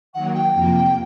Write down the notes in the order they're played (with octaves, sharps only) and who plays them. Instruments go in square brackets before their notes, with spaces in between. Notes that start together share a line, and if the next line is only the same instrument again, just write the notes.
[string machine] D#3 F#3 A#3 [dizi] F#5
[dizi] G5
[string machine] F2 C3 F3 A#3